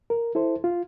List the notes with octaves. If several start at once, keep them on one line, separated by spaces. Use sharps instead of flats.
A#4
E4 A4 C5
F4